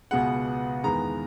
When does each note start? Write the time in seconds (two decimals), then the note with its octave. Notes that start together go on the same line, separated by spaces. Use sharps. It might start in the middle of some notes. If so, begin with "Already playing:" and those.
0.11 C#2 B2 G#3 B3 F#5
0.84 E2 D#3 G#3 B3 A#5